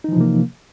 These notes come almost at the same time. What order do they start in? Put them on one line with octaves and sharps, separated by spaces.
D#4 E3 F3 C3 A#3